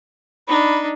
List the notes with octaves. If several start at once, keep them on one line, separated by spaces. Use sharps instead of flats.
D4 D#4 B5